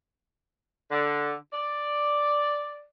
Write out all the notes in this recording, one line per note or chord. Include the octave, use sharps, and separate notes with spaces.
D3
D5